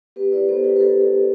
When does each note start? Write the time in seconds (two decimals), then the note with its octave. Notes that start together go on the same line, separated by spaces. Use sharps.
0.16 B3 G4 B4
0.32 E4 B4 D5
0.48 B3 A4 C5
0.64 E4 G4 B4
0.76 B4
0.80 E4 A4
0.96 B3
1.01 A4
1.12 B3